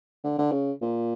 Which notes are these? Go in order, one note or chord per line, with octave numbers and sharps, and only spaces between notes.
D3
D3
C#3
A#2